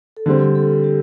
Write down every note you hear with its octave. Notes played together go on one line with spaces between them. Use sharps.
A4
D3 G3 C4 G4
A4
G4